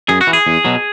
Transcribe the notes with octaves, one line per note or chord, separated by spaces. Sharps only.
F#2 G#4
F#4
E3
G#4
E2
B2 F#3